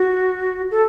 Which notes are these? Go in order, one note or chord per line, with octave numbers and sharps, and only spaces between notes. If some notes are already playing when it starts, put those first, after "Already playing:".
Already playing: F#4
A4